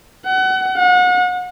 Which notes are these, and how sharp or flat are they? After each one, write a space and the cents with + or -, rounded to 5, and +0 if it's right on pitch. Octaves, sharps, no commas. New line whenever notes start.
F#5 +30
F#5 -35